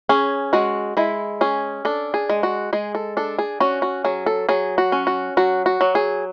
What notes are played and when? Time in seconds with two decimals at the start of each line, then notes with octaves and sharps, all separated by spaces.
0.09 C#4 G#4
0.53 G#3 F#4
0.97 G#3 E4
1.41 C#4 G#4
1.85 D4 A4
2.14 G#4
2.30 G#3
2.43 F#4
2.73 G#3 G#4
2.95 A4
3.17 D4 A4
3.39 G#4
3.60 C#4 F#4
3.82 F#4
4.04 F#3 G#4
4.26 A4
4.49 F#3 G#4
4.78 F#4
4.92 C#4
5.07 F#4
5.37 F#3 F#4
5.66 F#4
5.81 F#3
5.95 G#4